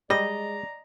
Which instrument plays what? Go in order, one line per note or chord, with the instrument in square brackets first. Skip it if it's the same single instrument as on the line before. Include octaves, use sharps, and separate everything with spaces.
[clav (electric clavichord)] G3 [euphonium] G#3 [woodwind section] D5 A#5 [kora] D#5